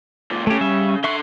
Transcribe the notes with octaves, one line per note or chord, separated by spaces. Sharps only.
C#2 A#2
C#3 A3 G4
G3 E5
D3 E5 C6 C#6 F#6